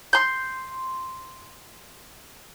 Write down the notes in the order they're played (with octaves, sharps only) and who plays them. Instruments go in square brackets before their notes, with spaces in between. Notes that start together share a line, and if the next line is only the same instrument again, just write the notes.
[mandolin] C6 G6